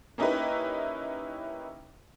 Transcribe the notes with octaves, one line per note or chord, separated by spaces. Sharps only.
A#3 C#4 D#4 E4 G4 B4